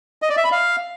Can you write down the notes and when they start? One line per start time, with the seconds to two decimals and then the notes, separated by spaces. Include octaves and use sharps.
0.22 D#5
0.30 D5
0.37 E5
0.44 B5
0.52 F5